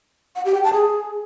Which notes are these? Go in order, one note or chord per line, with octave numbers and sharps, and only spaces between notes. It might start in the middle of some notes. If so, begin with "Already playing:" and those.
F#5
G4
G5
A5
G#4